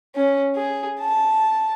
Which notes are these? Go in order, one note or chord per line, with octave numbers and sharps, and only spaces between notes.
C#4
G#4
A5